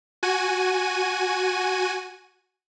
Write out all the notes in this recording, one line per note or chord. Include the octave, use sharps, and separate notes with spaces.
F#4 G#5 D#7